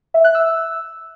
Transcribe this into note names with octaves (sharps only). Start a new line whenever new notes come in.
E5
F#6
E6